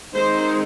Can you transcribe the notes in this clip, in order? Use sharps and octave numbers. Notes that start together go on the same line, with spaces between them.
D#3 G#3 C4 D#4 C5